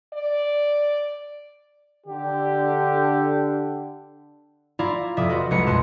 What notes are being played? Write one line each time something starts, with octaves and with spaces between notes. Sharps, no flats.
D5
D3 G4
E4 F4 D5 F5 A#5
F1 D5 E5 D#6
F4 F#4 B4 D5 D#5
C2 G#3 B4 D#5 A#5 C#7
F2 B2 A5 C6 F#6 D7